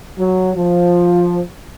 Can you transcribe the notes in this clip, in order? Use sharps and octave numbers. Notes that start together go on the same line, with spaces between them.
F#3
F3